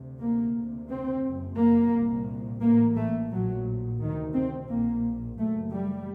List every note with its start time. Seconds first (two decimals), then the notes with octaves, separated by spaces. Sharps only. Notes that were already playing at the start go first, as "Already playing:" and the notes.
Already playing: D2 C3
0.20 A#3
0.54 D2 C3
0.89 C4
1.23 F#1 F#2
1.58 A#3
1.92 C2 A#2
2.62 A1 A2 A#3
2.96 A3
3.31 A#1 A#2 F#3
3.99 D2 C3 D#3
4.34 C4
4.69 A#1 A#2 A#3
5.38 F#1 F#2 A3
5.73 G3